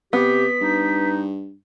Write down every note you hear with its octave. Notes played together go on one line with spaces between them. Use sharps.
C3 B3 G4 B6
G2 D#4